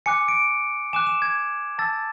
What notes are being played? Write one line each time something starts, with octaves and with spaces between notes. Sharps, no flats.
G#5 D6 F#6 C#7
D7
G#5 D6 F#6 E7
E7
G#6
A5 E6 A6